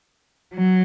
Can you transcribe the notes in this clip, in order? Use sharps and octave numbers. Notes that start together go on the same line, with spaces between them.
F#3